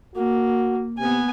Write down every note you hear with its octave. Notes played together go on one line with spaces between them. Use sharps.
A#3 F#4
C3 B3 G#5